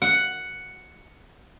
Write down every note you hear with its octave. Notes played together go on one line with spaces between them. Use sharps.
F#5